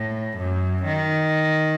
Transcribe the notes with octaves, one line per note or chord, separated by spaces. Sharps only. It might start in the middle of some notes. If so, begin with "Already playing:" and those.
Already playing: A2
F#2
D#3